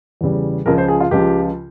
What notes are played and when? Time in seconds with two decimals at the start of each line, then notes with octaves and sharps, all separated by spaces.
0.21 E2 C#3 G3
0.66 C#2 C#3 F3 A#4
0.78 C5
0.88 G#4
1.00 F4
1.11 C#2 C#3 F3 G4